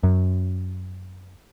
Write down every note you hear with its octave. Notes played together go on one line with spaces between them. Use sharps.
F#2